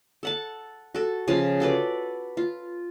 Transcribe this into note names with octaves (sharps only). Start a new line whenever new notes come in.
A4 F#5 A5
F#4 A4
C#3 F3 G#5 A5
F#4 A4 B4 D5
F4